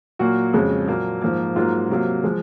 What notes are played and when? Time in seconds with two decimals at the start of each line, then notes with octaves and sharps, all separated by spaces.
0.19 A#2 F#3 A#3 F#4
0.53 F2 C#3 G#3
0.88 A#2 F#3 A#3
1.22 G#2 F3 A#3
1.56 G#2 F#3 A#3 F4
1.90 C3 F#3 A#3
2.24 F3 G#3